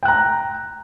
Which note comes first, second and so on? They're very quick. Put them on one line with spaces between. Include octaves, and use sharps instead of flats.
G5 F#6 A#5